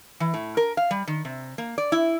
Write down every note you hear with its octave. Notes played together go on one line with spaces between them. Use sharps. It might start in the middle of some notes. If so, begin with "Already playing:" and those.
E3
A2
A#4
F5
G3
D#3
C3
A#3
D5
E4